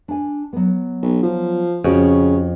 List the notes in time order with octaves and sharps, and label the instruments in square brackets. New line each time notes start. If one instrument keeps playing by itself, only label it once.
[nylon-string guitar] D4 G#5
F#3 B3
[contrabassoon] B1
F3
[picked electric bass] F2 [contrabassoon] C#3 [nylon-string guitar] C#4 F#4 C#5